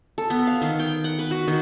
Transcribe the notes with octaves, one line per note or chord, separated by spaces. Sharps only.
A4
B3
F5
D#3
G5
F#5
B4
F#4
D#3